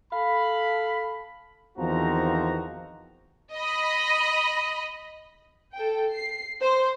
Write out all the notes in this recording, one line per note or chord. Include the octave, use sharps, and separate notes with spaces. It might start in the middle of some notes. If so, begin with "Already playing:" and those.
A4 F5 B5
E2 D#3 F3 C4 F#4 A#5
D#5 B5
A4 G5
C7
C5